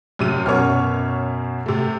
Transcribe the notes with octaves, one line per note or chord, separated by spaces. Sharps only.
F#2 C3 D#7
F#2 B2 C#5 D6 F6
C3 A3